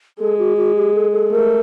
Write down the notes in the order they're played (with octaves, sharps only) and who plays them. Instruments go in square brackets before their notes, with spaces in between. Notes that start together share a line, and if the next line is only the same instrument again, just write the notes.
[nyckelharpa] G#3 [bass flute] A4
[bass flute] F#4
F#4
G4
A4
A4
[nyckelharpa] A3 [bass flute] A#4